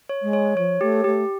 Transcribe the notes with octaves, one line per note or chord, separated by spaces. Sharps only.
C#5
G#3
C#5
F3 C#5
A3 G4
A3 G4